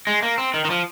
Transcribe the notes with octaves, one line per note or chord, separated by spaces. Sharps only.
G#3
A#3
C4
D#3
D#3
F3